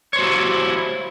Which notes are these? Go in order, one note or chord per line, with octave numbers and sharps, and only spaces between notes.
E4 F#4 G4 C5 C#5